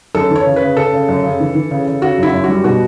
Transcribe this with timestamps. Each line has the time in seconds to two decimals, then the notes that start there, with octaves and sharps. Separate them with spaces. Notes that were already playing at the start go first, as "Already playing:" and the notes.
0.15 F#2 A4
0.31 E3
0.36 C#5
0.46 C#3
0.56 B4
0.62 C#3
0.77 C#3 A4
0.93 C#3
1.09 F#2
1.24 C#3
1.40 E3
1.55 E3
1.71 C#3
1.87 C#3
2.02 C#3 F#4
2.18 F#2 E4
2.33 F#2
2.44 G3 F#4
2.64 B2 F#4